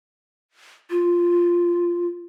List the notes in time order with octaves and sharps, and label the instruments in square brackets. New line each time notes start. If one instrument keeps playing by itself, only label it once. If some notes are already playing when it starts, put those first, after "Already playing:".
[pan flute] F4